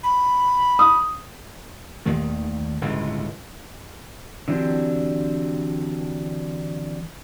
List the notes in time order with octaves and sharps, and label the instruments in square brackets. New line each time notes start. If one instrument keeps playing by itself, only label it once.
[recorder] B5
[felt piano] D#6
[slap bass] D#2 A#2 D#3 A3
G1 C#2 A2
[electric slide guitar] D3 E3 F#3 C4 D4 G4